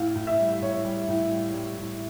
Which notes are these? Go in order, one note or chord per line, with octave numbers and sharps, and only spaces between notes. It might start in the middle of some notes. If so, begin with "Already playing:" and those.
Already playing: A2 F5
A2
E5
G3
A2 C#5
G3
A2
G3
G3
A2